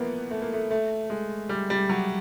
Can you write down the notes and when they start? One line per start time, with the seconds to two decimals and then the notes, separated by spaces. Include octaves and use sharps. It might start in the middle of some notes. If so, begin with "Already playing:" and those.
Already playing: E3 F3 A#3 B3
0.31 A3
0.42 A#3
0.53 A3
0.71 A3
1.10 G#3
1.49 G3
1.70 G3
1.89 F#3